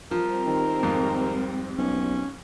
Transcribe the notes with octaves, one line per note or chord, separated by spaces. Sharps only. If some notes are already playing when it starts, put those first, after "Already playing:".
F3 G3 C4 A#4
D#3
F2 G#2
B1 C#4